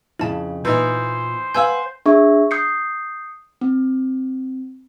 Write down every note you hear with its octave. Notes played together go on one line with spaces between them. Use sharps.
F2 C#3 E4 A5
A#2 E3 D#4 C5
B4 F5 F#5 G#5 E6 G6
D4 G#4 E5 C#6
D#6 G6 C7 C#7
C4